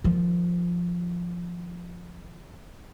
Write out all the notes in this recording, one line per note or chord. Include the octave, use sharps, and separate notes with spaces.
D#3 F3